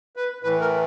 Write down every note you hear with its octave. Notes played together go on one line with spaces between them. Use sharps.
B4
A2 E3 B4
A#4